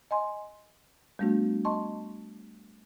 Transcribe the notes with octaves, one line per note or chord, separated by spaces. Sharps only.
D#5 G#5 C6
G3 A3 B3 D4 F#4
D#5 A5 C6 C#6